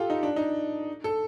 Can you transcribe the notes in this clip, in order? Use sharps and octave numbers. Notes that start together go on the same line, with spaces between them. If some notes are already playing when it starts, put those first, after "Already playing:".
Already playing: F4 G4 A4
D#4
D4
D#4
A4